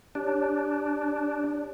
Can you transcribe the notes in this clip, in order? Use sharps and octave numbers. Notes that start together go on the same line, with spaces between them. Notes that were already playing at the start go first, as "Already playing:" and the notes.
D4 G4 C#5